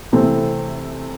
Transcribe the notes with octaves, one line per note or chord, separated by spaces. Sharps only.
C3 E3 A3 C4